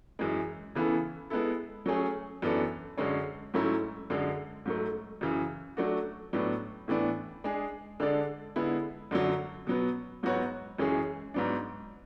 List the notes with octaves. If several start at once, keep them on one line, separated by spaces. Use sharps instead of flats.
F#2 E3 G#3
C#3 E3 B3 E4 A4
G#3 B3 E4 A4
F#3 A3 C#4 G#4
F#2 E3 B3 D4 A4
F#2 D3 G#3 C#4
G#2 F#3 A3 C#4 E4
F#2 D3 G#3
G#2 F#3 A3
F#2 C#3 E3
F#3 A3 D4 F#4
A2 F#3 B3 D4
A2 E3 B3 D4
G#3 D4 G#4
D3 G#3 D4 A4 D5
D3 G#3 B3 E4
F#2 D3 F#3
B2 F#3 B3
G#2 F#3 B3 F#4 C#5
F#2 E3 G#3 C#4 G#4
G#2 F#3 B3 D4